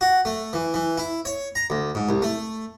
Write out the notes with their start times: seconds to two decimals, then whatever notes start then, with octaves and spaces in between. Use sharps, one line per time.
0.01 F#4
0.25 A3
0.53 E3
0.74 E3
0.98 E4
1.25 C#5
1.55 A#5
1.70 D2
1.95 G#2
2.09 C2
2.22 A3